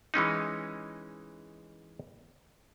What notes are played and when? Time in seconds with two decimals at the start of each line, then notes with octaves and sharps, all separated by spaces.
0.14 E3 G#3 C#4 D#4